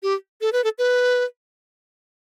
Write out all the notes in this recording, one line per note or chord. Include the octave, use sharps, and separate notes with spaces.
G4
A4
B4
A4
B4